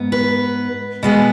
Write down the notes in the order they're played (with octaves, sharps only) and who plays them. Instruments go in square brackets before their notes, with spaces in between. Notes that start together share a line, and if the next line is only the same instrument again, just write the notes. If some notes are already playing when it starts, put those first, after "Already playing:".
Already playing: [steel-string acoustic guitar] G#2 B3
B4
B2 G#3 B3